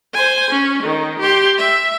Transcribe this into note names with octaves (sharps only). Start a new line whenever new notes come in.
C5 G#5
C#4
D#3
G4 C6
E5